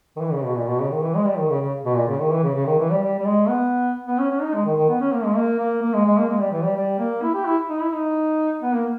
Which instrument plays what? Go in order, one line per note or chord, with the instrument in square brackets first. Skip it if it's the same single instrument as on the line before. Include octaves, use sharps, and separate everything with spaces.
[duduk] D#3
E3
C#3
B2
A#2
B2
C#3
D#3
E3
G#3
G3
D#3
C#3
C#3
B2
A#2
C#3
D#3
E3
C#3
C#3
D#3
E3
G3
G3
G3
G#3
B3
B3
C#4
C#4
D#4
G#3
D#3
D#3
B3
C#4
A#3
G#3
A#3
A#3
A#3
G#3
G#3
A#3
G#3
G3
E3
G3
G3
A#3
E4
G4
E4
D#4
E4
D#4
B3
A#3